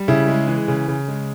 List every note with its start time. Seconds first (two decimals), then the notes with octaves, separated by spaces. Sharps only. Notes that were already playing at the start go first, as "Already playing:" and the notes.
Already playing: G3
0.08 C#3 E4
0.28 G#3
0.47 E3
0.68 C#3
0.88 C#3
1.08 G#3